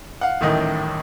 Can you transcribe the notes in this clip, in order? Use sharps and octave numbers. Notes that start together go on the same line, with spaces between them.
F5 F#5
D#1 A1 A2 D#3 E4 D#5